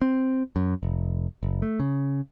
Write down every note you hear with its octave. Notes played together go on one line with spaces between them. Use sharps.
C4
F#2
F1
F#1
A3
C#3